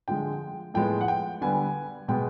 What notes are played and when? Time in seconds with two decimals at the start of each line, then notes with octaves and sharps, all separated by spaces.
0.08 D3 F3 G#3 G5
0.74 A2 F3 G#3 B3 G5
1.01 F#5
1.08 G5
1.41 D3 G3 B3 G#5
2.08 B2 G#3 B3 G5